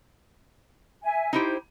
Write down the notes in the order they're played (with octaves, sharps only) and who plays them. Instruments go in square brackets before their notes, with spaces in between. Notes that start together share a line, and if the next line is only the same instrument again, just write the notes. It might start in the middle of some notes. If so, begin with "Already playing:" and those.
[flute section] E5 G#5
[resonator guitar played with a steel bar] D#4 E4 G4 [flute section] C5